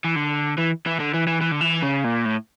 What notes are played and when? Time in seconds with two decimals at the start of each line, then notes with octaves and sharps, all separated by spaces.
0.04 E3
0.16 D3
0.57 E3
0.86 E3
1.00 D3
1.14 E3
1.27 E3
1.41 E3
1.51 D3
1.61 E3
1.83 C#3
2.04 A#2
2.25 A2